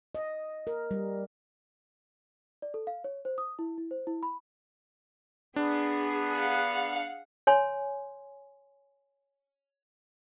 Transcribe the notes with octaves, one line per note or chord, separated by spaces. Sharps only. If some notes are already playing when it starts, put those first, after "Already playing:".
D#5
A#4
G3
D5
A4
F5
C#5
C5
D#6
E4
E4
C5
E4
B5
B3 D4 G#4
F5 F#5
C#5 G#5 C6